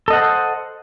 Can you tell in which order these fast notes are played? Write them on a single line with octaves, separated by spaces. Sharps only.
A4 D#5 F#5 C5